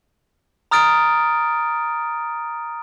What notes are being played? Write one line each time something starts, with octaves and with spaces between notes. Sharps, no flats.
A#5 D#6 F6 A6 D7